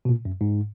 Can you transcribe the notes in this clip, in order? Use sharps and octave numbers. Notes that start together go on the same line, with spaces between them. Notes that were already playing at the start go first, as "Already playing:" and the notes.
B2
A#2
F#2
G#2